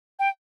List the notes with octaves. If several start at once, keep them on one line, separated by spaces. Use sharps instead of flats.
G5